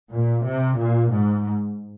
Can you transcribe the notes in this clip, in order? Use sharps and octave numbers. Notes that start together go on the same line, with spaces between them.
A#2
C3
A#2
G#2